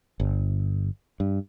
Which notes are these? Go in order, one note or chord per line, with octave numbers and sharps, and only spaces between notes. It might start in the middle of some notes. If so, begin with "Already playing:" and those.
G1
G2